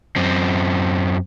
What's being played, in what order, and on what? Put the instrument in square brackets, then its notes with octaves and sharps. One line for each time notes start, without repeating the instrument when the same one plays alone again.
[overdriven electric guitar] F#2 C4